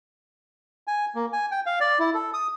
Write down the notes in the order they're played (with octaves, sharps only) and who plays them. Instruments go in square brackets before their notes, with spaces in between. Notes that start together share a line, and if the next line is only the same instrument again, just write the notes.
[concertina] G#5
A#3
G#5
G5
F5
D5
E4
A4
D#6